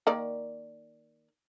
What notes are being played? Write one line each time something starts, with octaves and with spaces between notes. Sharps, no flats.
D#3 A#3 D5